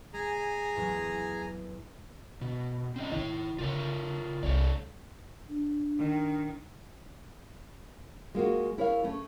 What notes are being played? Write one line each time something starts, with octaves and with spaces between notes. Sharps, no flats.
G#3 G#4 G#5 A#5
E2 A2 F#3
B2
C4 C#4 D#5
D#3 D#4 E4 C#5
C#3 F4 A#4 C#5
C2 G#3 A4 C#5 D5
D4
D#3
G#3 A#3 F4 F#4
E4 A#4 C#5 D#5 F5
A3 C#4